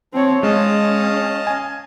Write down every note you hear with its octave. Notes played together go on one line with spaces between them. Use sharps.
F3 C4 C#5
G#3 C#4 D#5 F5 A5
G#5